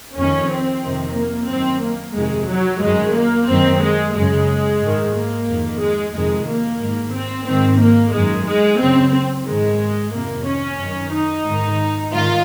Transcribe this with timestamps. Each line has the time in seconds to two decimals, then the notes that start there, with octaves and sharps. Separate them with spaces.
0.16 F2 D#3 C#4
0.49 C4
0.83 F2 C3 D#3
1.16 A#3
1.49 F#2 D#3 C4
1.83 A#3
2.16 F2 C3 D#3 G#3
2.49 F#3
2.82 F#2 D#3 G#3
3.15 A#3
3.49 F#2 D#3 C4
3.82 G#3
4.15 F#2 C#3 G#3
4.81 G#2 D#3
5.15 A#3
5.48 F2 D#3
5.81 G#3
6.14 F2 C3 D#3 G#3
6.48 A#3
6.81 G#2 D#3
7.14 C4
7.47 G#2 D#3 C4
7.81 A#3
8.14 F#2 D#3 G#3
8.47 G#3
8.80 F#2 C#3 C4
9.47 G#2 D#3 G#3
10.14 F2 C3 D#3 A#3
10.47 C#4
10.80 F#2 D#3
11.13 D#4
11.46 G#2 D#3
12.12 G#2 D#3 F4